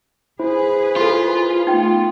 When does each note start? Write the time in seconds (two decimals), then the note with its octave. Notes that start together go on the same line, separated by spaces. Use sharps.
0.39 E4 G#4 B4 C5
0.96 F4 A4 C6
1.67 A3 B3 D#4 G5